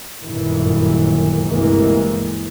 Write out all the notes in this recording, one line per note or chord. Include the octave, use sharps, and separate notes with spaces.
G1 F#2 A#2 D#3 E3
G1 D2 C3 E3 G#3 A#3